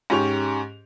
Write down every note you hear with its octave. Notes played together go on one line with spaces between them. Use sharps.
G#2 C#4 G4 C#6 F7